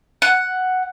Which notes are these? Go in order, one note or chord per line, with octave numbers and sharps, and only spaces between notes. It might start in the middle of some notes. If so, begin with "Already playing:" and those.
F#5